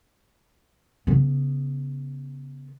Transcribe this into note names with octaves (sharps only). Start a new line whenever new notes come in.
C#3 B3